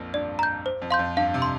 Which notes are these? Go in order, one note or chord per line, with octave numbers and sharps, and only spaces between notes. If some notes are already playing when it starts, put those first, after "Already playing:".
Already playing: A#1 F2 A#2
G2 D5
A#5 G6
C5
F2
F5 C6 G6
F2
G2 F5
C3
C6